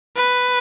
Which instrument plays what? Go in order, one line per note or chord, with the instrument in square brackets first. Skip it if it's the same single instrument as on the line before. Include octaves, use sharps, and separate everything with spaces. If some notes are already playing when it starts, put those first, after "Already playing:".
[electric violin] B4